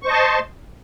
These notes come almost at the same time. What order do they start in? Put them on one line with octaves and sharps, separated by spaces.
C#6 C5 D#5 A5 C6